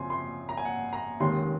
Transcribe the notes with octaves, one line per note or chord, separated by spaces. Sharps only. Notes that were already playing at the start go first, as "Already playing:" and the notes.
Already playing: F#2 C#3 F3 C4 G#5 C6
C6
A#5
G#5
F#5
A#5
F1 D#2 D#3 G#3 C#4 C6